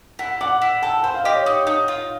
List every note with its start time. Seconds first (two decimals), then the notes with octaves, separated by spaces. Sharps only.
0.19 E4 F#5
0.41 D5 F#5
0.62 E4
0.82 A4 G5
1.03 C5 G5
1.14 F5
1.24 G4 D#5
1.35 C#5
1.46 D#4
1.67 D#4
1.88 F4